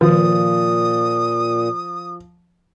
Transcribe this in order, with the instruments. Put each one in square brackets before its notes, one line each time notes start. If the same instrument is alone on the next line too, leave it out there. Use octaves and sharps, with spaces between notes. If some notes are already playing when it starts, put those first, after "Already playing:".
[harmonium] A#2 [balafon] D#3 [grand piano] F3 [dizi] D#6